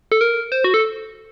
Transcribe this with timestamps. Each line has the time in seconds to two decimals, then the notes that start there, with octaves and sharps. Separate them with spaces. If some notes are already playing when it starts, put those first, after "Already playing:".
0.12 A4
0.21 A#4
0.52 C5
0.64 F#4
0.74 A4